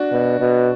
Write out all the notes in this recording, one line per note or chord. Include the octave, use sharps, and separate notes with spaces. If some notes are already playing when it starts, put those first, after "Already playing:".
Already playing: D4 F#4
B2
B2